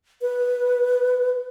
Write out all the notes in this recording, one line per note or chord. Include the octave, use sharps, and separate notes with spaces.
B4